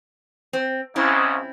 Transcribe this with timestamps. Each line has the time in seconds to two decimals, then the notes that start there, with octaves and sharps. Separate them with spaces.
0.53 C4
0.96 C#2 G#2 C#3 C4 C#4 E4